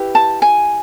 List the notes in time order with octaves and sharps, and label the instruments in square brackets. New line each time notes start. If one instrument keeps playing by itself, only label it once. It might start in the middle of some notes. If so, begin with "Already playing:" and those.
Already playing: [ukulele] E4 G4 B4
A5
G#5